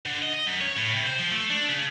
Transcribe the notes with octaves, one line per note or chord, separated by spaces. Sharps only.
D3
D#5
D#5
F#2
C#5
A2
C3
C5
F3
A3
D4
C#3